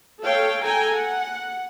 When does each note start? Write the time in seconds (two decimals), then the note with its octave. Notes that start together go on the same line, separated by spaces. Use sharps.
0.22 A4 C#5 F5 G5
0.65 A4 G5 G#5 A#5
0.95 F#5